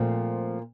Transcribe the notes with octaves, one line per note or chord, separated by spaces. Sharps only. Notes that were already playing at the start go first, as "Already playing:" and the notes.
Already playing: A#2 F3 A3 C4